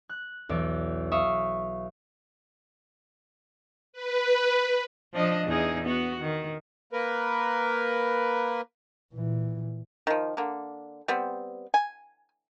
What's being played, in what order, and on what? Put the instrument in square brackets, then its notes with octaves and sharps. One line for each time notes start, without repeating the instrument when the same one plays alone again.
[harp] F#6
B1 E2 D5
E5 F5 C#6 D#6
[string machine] B4
[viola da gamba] F3 D4 D#5
E2 D#4 G#4
B3 F#4
D#3
[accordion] A#3 A#4 B4
[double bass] A#2 E3
[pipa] D#3 F3
D3 A#3
G3 B3 C4
G#5